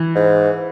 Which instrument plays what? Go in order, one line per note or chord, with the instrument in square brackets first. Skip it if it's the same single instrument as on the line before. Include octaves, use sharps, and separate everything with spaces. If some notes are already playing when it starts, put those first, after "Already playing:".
Already playing: [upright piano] E3
[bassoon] G#2